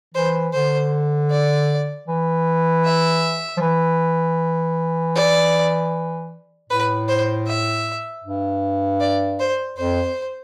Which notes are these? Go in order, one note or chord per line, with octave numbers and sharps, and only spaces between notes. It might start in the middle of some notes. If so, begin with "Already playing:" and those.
E3 C5
D3 C5
D5
E3
E5
F3
E3
D5
A2 B4
C5
E5
G2
D5
C5
F2 C5